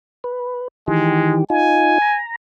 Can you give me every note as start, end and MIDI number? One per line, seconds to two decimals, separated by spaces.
0.24 0.68 71
0.88 1.44 51
0.88 1.44 52
0.88 1.39 56
0.88 1.44 67
1.50 1.98 63
1.50 1.98 65
1.50 2.20 80
2.02 2.36 82